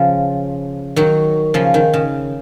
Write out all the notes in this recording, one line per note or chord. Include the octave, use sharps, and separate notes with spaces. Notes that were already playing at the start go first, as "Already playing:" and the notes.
Already playing: C#3 F3
D#3 F#3
C#3 F3
D#3
C#3